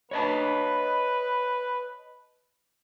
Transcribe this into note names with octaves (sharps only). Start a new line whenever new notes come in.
B4 C#5 D#5 A5